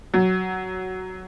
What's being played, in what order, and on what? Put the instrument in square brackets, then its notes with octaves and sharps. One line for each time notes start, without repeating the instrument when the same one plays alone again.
[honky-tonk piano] F#3